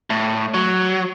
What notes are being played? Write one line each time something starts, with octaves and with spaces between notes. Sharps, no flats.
A2
F#3